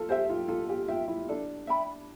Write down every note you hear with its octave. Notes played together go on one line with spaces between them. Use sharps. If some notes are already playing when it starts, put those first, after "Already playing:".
Already playing: F4 A4
G4 C5 E5
F4
F4 A4
G4
F4 E5 G5
E4
D4 A4
E5 G5 B5